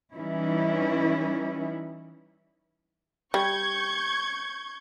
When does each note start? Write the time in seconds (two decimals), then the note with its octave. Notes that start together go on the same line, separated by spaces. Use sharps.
0.13 E3 G3 C#4 D#4 E4
3.34 G3 C#6 G6 G#6